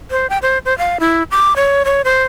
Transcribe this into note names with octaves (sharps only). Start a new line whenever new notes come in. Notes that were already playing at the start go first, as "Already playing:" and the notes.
C5
G5
C5
C5
F5
E4
D6
C#5
C#5
C5